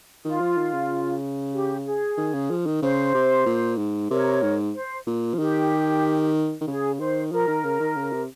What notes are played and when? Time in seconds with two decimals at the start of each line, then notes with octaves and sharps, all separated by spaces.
0.25 D#3 F4
0.41 F3
0.57 D#3
0.73 C#3
1.53 G4
1.86 G#4
2.18 D#3
2.33 C#3
2.50 F3
2.66 D#3
2.82 C#3 C5
3.14 C3
3.46 A#2
3.78 G#2
4.10 C3 A#4 C#5
4.43 G#2
4.75 C5
5.07 A#2
5.34 F3
5.39 D#3 G4
6.61 D#3
6.67 C#3 G#4
6.99 D#3 C5
7.31 F3 A#4
7.47 D#3
7.64 C#3
7.80 D#3
7.96 C#3
8.12 C3